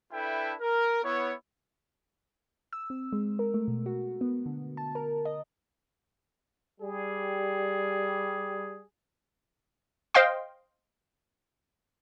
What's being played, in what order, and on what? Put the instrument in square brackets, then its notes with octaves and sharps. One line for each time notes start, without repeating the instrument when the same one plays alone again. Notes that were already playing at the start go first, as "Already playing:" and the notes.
[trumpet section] D4 E4 A4 B4 E5 G5
A#4
B3 E4 C#5
[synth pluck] E6
C4
G#3
A#4
A3
B2
F#4
B3
D3
A5
A#4
D#5
[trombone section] G3 [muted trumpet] G#4
[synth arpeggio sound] C5 D#5 F5 G5 C6